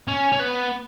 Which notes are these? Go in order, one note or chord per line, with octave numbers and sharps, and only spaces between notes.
C#4
C#4
B3